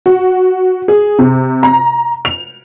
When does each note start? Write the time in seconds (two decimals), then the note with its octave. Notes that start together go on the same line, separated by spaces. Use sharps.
0.06 F#4
0.88 G#4
1.19 C3
1.63 A#5
2.25 F7